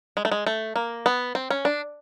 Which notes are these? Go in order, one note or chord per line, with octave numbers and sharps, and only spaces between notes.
G#3
A3
G#3
A3
A#3
B3
C4
C#4
D4